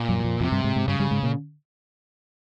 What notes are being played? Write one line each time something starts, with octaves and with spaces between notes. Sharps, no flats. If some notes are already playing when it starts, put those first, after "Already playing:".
Already playing: A#2
F#2 F#3
F#3
F2 F3
F2 C3 F3
G2 G3
G#2 G#3
G#2 G#3
G2 C#3 G3
G2 G3
G#2 G#3
A#2 A#3